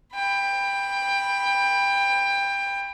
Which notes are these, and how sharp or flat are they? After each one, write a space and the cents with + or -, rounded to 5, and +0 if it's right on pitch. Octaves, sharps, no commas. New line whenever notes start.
G5 +20 B5 +0